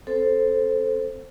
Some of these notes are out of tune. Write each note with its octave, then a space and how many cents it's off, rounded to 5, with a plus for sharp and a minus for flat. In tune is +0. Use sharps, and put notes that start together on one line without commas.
C4 +0 A4 +0 C5 +0